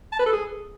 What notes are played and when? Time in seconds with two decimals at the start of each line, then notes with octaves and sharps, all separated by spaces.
0.12 A5
0.19 B4
0.26 A4
0.33 G#4